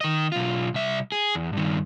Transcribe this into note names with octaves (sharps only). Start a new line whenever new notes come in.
D#3 D#5
B1 F4
C2 E5
G#4
E2
G2 D#3